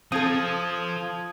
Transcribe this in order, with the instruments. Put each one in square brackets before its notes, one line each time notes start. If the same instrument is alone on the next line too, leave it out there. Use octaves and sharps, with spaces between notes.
[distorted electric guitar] F3 [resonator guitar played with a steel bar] C4 A4 [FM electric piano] D#6 G#6